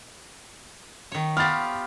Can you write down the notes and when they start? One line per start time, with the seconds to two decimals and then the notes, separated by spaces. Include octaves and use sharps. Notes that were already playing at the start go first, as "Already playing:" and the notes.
1.12 D#3 C#5
1.37 B3 F4 G4 F6 A6